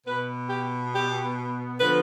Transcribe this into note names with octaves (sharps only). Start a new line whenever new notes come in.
B2 B3 B4
G4
G4
D3 F3 B3 B4